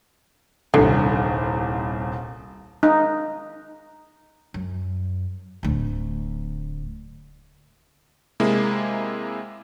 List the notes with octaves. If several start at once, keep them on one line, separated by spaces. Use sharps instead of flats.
D#1 C2 D3
D#4
F#2
D1 D2
C3 G#3 A#3 E4 G#4